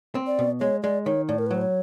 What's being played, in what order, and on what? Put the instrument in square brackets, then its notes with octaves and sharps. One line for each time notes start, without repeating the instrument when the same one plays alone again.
[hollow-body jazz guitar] C4
[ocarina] D5
[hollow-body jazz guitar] B2
[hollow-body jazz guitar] G#3 [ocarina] C#5
[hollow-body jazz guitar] G#3 [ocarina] D5
[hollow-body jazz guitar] D#3 [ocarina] C#5
[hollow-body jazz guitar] A2 [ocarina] D5
[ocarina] A#4
B4
[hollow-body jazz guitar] F#3 [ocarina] C5
[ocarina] C#5